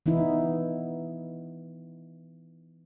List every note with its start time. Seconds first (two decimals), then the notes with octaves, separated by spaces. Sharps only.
0.06 E3 B3 D#4 E4